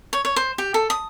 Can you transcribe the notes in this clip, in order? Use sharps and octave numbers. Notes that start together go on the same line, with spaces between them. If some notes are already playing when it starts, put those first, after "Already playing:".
C#5
C#5
C5
G4
A4
D#6